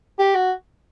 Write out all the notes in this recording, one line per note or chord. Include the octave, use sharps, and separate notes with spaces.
G4
F#4